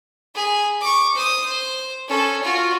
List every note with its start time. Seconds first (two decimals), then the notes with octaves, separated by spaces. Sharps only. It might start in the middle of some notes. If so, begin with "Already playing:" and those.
0.35 G#4 B5
0.81 C#6 D6
1.15 C5 D#6
1.45 C5
2.08 C#4 A4
2.43 F4 F#4